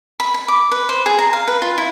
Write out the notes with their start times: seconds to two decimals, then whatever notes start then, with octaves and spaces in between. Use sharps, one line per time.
0.20 B5
0.34 B5
0.48 D6
0.71 B4
0.89 C5
1.06 G#4
1.19 A#5
1.33 F5
1.48 B4
1.62 F4
1.78 E4